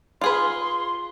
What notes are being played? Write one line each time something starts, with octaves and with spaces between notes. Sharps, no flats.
F4 G#4 B4 C6